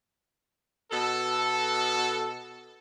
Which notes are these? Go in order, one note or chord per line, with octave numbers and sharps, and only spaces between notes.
B2 A4